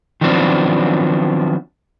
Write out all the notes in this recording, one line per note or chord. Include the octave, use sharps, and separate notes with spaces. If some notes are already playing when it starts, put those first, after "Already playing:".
D#3 F3 F#3 B3 C4 D4